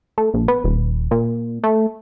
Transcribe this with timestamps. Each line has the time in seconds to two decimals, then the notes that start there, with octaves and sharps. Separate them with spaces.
0.18 A3
0.34 A#1
0.48 B3
0.64 D#1
1.11 A#2
1.64 A3